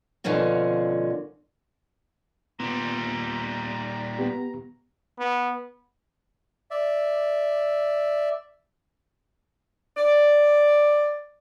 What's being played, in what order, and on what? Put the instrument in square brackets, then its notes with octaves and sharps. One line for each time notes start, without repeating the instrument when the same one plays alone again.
[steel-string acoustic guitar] B2 D3 F3 A#3 C#4 F#4
[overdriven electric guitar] A#2 G3 [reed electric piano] B3 [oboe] A#5
[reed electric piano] B3 G4
[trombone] B3
[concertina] D5 E5
[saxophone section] D5